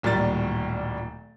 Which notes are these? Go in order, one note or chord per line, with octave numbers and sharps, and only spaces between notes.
D1 A#2 D#3 G3 A6